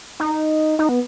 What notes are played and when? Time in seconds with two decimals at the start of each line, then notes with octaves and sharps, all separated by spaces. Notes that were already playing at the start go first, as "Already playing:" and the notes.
0.20 D#4
0.79 D#4
0.89 B3